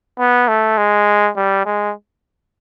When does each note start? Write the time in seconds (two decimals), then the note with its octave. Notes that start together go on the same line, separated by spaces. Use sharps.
0.20 B3
0.48 A3
0.78 G#3
1.37 G3
1.66 G#3